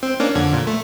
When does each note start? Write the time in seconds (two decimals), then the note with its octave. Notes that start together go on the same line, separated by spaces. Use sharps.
0.03 C4
0.20 A#3 C#4 D4
0.35 F2 D3 G#6
0.53 A#2
0.67 A3